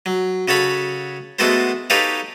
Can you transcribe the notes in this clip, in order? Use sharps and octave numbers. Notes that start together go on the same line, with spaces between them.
F#3
C#3 F#4 A4 C#5 B5
G#3 A3 B3 F#4 A4 C5
D#4 G4 A4 B4 C#5 F5